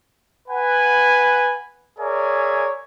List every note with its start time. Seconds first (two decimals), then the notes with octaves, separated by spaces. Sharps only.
0.48 B4 F#5 G#5
1.99 G#4 A#4 C#5 D5 E5 G#5